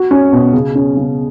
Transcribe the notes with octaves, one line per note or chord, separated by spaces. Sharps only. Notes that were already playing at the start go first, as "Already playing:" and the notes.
Already playing: F#4
C#4
B2
C#3
C#4
C#3